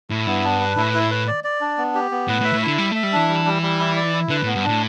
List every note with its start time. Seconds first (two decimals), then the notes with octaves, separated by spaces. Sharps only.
0.10 A2 E4
0.26 G2 B3
0.44 D4
0.60 B4
0.77 A2 E4
0.94 E4
1.11 B4
1.27 D5
1.44 D5
1.61 D4
1.78 B3
1.95 G4
2.11 B3
2.28 A2 B4
2.41 A2
2.45 E5
2.53 A2
2.62 D3 E4
2.78 G3 E5
2.92 A3 E5
3.03 G3
3.13 E3 D4
3.28 G3
3.45 G3
3.62 G3
3.80 E4
3.96 D5
4.13 E4
4.29 D3 B4
4.43 A2 B3
4.54 G2
4.64 A2 D4